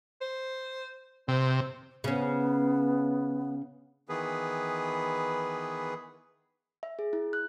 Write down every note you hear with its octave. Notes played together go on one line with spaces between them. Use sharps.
C5
C3 C4
C#3 B3 C#4
D#3 E3 B3 G#4 B4
E5
G#4
E4
F#6